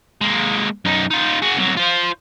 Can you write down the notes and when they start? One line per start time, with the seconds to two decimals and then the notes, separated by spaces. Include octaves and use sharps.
0.21 G#3 A#3
0.85 F#2 D#4
1.11 D#4 F4
1.42 F#4 G#4
1.57 C2 F#3
1.77 F4 C5